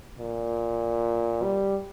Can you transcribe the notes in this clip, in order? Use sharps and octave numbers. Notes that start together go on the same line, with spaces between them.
A#2
G3